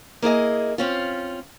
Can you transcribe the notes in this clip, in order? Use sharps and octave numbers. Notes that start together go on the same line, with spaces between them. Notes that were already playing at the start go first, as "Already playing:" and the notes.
A#3 E4 G#4 D#5
C4 C#4 F4